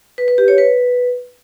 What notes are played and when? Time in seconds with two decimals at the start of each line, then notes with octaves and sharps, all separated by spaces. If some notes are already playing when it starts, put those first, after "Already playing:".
0.18 B4
0.28 B4
0.38 G4
0.48 C#5
0.58 B4